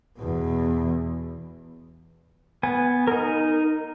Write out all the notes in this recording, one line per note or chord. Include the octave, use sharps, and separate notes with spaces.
E2 B2
B3 G#5
D#4 A#4